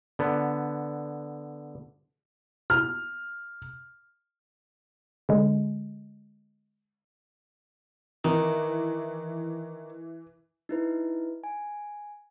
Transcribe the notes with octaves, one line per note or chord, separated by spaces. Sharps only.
D3 B3
F6
D3 G#3
D#3 E3
D#4 E4 B4
G#5